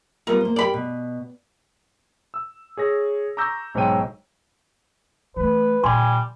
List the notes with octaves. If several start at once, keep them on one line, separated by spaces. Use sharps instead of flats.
G3 B3 F4 A#4
A#3 C5
G4 G#4 A#4 D5 B5
B2
E6
G#4 C#5 A#6
A#5 C#6 D6 E6 G6 A#6
B1 G#2 C5 C#5 G5 D#7
E3 A3 B4
A#2 D3 G3 G#5 C6